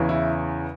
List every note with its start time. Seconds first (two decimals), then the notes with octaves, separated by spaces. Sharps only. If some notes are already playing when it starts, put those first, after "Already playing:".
Already playing: E2 C#3 E3
0.09 E4